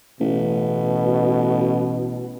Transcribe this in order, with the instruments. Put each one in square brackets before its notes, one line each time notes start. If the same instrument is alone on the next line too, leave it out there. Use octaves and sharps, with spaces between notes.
[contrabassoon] A1 [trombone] B2